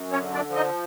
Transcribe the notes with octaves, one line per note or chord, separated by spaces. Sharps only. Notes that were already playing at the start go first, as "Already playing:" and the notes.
Already playing: F#2
C#4 C#5
D3
D4 D5
F3
D#4 D#5